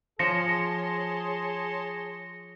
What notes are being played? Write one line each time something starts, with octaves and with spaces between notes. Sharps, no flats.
F3 G#4 C#5 A5 C6 A#6 C#7